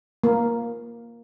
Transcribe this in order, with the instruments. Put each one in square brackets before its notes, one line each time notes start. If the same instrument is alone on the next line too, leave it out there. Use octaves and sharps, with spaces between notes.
[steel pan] A#3